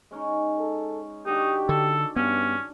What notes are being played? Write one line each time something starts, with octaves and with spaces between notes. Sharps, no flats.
G#3 C#4 D#4
A4
D#3 D4 D#4 F#4 G4
D3 A4
G2 B3 C#4